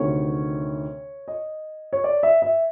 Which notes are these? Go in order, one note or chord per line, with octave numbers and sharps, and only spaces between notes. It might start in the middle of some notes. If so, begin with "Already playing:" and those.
Already playing: D2 C3 D#3 C#5
D#5
C#5
D5
E5
E5